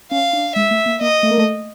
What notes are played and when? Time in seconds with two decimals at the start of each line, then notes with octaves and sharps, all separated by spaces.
0.11 C#4 F5
0.33 D4
0.55 G#3 E5
0.71 A3
0.86 A#3
1.01 A#3 D#5
1.23 A3
1.30 A#3
1.38 A3